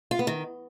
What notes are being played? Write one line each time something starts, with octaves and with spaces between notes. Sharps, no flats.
F4
B3
D#3